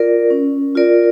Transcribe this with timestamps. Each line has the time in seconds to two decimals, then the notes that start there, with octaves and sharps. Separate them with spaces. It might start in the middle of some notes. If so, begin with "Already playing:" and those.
Already playing: F4 A#4 D5
0.30 C#4
0.75 F4 A#4 D5